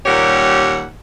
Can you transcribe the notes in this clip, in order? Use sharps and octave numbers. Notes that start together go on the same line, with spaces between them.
D#2 A#2 G3 G4 C#5 F#5